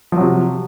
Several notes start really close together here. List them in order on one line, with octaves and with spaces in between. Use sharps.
F3 F#3 C3